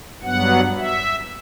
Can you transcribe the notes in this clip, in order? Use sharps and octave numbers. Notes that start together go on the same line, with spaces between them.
G2 F#3 B3 F#5
E5